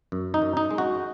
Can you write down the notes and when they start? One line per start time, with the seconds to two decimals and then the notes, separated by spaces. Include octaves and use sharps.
0.12 F#2
0.34 D#4
0.42 F#2
0.57 D#4
0.71 G#3
0.78 F#4